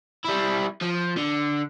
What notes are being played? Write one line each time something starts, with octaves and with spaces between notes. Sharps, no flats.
G3 E4
F3
D3